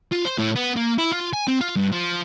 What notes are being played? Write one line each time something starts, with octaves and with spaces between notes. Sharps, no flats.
F4
C5
A2
B3
A#3
E4
F4
G#5
C4
F4
G2
F3